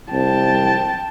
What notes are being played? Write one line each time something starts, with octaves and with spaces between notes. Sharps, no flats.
C2 G5 A5